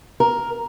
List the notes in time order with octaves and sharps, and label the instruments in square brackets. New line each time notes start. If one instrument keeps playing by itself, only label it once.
[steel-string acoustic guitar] A#4